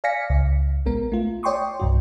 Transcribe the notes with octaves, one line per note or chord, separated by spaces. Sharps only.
D5 F5 G#5 A#6 B6 C#7
C#2
A#1 G#3 B3 A#4
A3 F4
C#5 D5 G5 C6 C#6 D#6
C2 G2 F#4